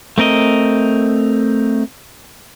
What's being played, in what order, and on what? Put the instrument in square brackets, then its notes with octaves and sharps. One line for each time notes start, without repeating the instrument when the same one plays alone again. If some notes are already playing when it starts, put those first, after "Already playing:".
[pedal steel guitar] A3 C4 A#4 D#5